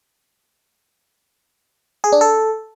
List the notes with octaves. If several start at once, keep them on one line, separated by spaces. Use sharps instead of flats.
G#4
D4
A4